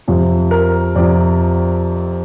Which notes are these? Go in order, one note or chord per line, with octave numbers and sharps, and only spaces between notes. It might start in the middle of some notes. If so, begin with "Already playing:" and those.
F2 C3 F3
A#4
F2 C3 F3 D5